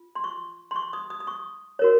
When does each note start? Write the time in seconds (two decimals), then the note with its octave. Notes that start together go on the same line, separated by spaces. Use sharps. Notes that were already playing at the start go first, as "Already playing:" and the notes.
Already playing: F4
0.15 C6
0.24 C#6
0.71 C6
0.76 C#6
0.93 D#6
1.10 D#6
1.20 D#6
1.27 C#6
1.79 F#4 A#4 C#5